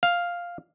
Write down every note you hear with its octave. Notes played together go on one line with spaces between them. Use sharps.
F5